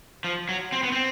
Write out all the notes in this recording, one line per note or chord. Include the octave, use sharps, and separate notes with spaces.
F3
F#3
C4
B3
C4